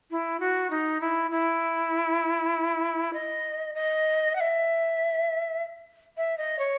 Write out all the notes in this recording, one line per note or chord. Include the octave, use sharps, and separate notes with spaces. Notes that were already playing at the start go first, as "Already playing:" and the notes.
E4
F#4
D#4
E4
E4
D#5
D#5
F#5
E5
E5
D#5
C#5